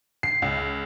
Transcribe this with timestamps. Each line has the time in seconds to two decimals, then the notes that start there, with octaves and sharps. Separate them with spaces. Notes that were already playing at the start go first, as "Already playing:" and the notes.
0.23 C7
0.42 C#2